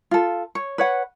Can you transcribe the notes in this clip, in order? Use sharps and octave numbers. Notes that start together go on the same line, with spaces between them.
F4 A4
C#5
B4 C#5 F#5